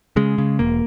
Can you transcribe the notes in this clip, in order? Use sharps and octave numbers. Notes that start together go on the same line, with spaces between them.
C#3 G#3
C#3
E1 A#3